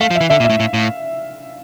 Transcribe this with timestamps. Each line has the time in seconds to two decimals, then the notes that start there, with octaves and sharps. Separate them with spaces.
0.01 A3 F5
0.11 F3
0.15 E5
0.21 E3
0.30 D3 E5
0.40 A#2
0.44 E5
0.50 A2
0.60 A2
0.74 A2